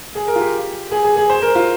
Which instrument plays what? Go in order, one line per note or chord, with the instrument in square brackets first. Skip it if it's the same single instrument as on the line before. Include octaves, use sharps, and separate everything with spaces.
[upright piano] G#4
A#4
F4
G4
G#4
G#4
G#4
C5
A#4
F4